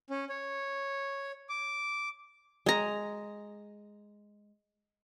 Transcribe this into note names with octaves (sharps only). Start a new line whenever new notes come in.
C#4
C#5
D6
G#3 A#5